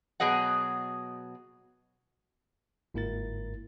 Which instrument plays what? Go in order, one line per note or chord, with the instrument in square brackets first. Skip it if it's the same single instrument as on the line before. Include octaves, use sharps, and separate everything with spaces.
[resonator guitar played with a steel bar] B2 F#3 G#4 D#5 F#5
[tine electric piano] G1 G#2 A#3 E4 A#4 A6